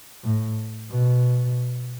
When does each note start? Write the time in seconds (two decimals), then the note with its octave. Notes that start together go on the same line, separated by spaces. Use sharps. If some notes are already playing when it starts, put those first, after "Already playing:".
0.24 A2
0.90 B2